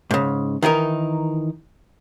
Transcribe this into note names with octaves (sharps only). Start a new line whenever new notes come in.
G#2 C#3
D#3 E3 D#4 A#4